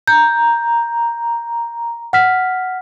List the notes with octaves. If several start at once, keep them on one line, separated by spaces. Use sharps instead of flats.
A#5 G6
F#5 F6 B6